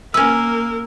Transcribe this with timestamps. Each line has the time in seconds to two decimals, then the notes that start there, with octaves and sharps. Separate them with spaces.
0.14 A#3 C#4 A#4 B4 E6